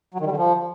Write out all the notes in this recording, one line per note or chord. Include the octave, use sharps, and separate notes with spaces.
F#3
D#3
G3
D3
F3